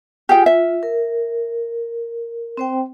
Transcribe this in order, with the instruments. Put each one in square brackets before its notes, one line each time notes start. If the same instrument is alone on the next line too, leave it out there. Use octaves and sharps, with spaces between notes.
[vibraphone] F4 G#5 [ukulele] G4 G#4 G5
[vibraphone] F4 [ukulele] E5
[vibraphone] A#4
C4 C5 G5